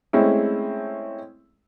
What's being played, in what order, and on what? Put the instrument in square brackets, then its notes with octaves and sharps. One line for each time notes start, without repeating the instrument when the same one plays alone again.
[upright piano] G#3 A3 C4 C#4 E4